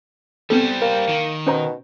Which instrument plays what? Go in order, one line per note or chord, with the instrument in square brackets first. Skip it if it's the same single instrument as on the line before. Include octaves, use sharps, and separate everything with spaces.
[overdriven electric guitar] G3 C5 [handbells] B3 C4 A4
[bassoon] A#3 [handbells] A#4
[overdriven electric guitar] D#3
[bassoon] B2 [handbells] C#4 C5 A#5